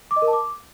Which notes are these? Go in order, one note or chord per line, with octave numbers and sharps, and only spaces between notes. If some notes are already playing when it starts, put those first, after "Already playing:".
D6
D#5
A#4
A5
D6